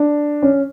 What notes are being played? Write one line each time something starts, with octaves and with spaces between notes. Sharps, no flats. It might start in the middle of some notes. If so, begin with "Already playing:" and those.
Already playing: D4
C#4